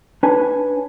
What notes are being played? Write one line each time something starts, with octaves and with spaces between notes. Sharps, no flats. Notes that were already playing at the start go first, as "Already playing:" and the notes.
D4 B4 C#5 G#5